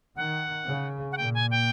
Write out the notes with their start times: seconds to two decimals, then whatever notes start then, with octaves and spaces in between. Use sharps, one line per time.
0.16 D#3 F#5
0.67 C#3
1.12 F#5
1.17 A#2 G5
1.34 G#5
1.51 G5